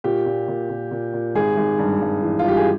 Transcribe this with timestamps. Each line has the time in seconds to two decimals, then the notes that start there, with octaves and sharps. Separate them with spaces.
0.04 A#2 G4
0.26 A#2
0.48 A#2
0.70 A#2
0.91 A#2
1.14 A#2
1.35 G#1 G#4
1.57 G#1
1.79 G2
2.01 G2
2.23 E3
2.39 F4
2.44 G2 G4
2.57 G#4